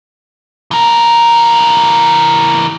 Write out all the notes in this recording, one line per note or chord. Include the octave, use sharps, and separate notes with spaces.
E3 A#4